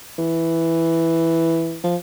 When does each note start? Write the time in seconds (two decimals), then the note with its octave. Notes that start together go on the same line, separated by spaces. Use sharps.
0.18 E3
1.84 F3